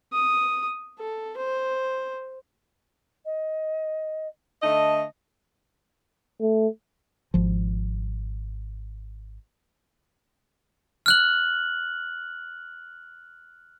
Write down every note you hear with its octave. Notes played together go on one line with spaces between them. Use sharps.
D#6
A4
C5
D#5
D3 A3 D#5 A5
A3
G#1 F3
F6 F#6 F#7